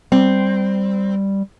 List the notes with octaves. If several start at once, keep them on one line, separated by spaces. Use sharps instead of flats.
G3 C4